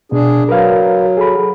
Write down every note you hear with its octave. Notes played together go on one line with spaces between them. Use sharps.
B2 D4 G#4
F#3 A#4 B4 F5
G#4 A4 B5